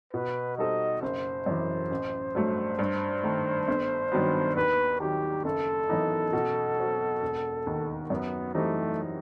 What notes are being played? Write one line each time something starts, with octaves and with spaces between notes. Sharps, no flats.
B2 B4
G3 D#4 A4 C5 D#5
F#1 C5
F#2 E3
A1
G2 F#3 A3
G2
D#3 A3
G1
G2 D#3 F#3 B3
D#2 B4
D#3 F#3 G4
F#1 A4
F#2 E3 B3 D#4
B2
F#3 C4 F#4
E1
D#2 D#3
F#2 B3
E3 G3 A3 C4 D#4